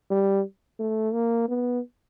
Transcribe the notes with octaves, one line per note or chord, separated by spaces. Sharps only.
G3
A3
A#3
B3